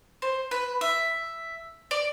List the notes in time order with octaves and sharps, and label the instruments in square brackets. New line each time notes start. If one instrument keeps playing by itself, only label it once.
[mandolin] C5
B4
E5
D5